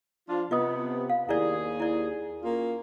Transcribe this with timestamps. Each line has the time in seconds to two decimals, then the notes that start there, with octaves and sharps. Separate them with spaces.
0.28 F3 D4 F4
0.51 C3 B3 F4 D#5 D#6
1.10 F5
1.29 D#2 E4 G#4 D5
1.80 E4 D5
2.42 A#3 C#4 F4